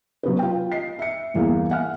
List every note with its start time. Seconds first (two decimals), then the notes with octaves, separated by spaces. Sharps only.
0.23 F#3 B3 B4
0.39 F4 G5
0.72 D#5 C7
0.99 E5 C#7
1.34 G1 E2 A#3 F5
1.70 E5 F#5 G#5 F6